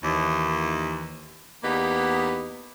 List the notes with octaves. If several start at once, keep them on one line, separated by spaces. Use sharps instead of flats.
D#2 E3
E2 A#3 B3 D#4 G4 F#5